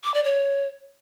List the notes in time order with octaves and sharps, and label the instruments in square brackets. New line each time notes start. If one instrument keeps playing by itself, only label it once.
[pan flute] D6
D5
C#5